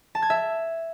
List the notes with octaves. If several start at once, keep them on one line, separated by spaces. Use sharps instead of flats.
A5
G#6
E5